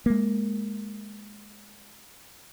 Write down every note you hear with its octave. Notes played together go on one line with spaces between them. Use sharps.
G#3 A#3